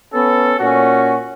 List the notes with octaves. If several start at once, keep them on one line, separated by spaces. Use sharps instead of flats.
B3 C#4 A4
A#2 C#4 F#4